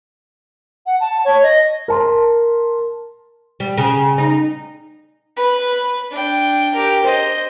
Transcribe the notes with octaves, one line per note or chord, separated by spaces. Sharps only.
F#5
A5
C#5
D#5
A#4 A5 C6
G3
C#3
D#4
B4 B5
D4 G5
G4 A#4
C5 D#5